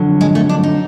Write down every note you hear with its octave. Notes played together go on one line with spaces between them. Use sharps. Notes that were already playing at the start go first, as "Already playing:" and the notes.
Already playing: F2 D3 F#3
G#3
A3
D4
D#4